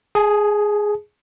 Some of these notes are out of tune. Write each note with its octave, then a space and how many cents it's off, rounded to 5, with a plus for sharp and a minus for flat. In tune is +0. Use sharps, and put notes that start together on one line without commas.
G#4 +0 A5 -40